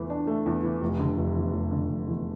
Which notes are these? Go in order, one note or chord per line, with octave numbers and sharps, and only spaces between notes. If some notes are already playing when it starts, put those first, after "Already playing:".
Already playing: E2 E3 A3
D4
A3
E2
E3
F1
D3
F1
E2
F1
D3
F1
E2